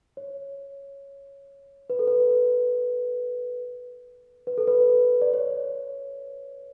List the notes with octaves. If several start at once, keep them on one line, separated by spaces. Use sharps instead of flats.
C#5
B4
A4
B4
B4
A4
B4
D5
C#5